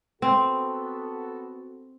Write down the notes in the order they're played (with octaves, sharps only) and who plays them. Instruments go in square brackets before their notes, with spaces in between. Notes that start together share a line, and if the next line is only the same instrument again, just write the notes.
[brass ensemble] B3 F#4 A4 [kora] C4